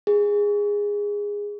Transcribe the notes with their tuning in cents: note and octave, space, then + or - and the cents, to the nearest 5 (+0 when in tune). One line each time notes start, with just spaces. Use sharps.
G#4 -15